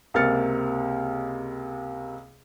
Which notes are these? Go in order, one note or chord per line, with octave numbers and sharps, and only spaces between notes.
C#2 C3 A#3 F6 A6 C#7